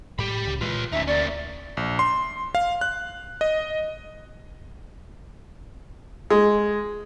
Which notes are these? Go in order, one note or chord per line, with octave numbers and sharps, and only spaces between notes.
A2 G4 B5
C#2 C#3
A#2 E3 G#3 F4 B4
D2 C#4 D#4 E5
A#3 C#4 D5
A#1
C6
F5
F#6
D#5
G#3